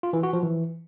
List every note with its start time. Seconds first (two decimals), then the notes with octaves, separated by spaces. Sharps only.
0.03 F4
0.13 E3
0.23 F#4
0.33 F3
0.43 E3